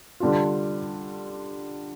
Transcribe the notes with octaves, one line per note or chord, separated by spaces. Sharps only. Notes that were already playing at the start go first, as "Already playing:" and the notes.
D3 G3 D4 F4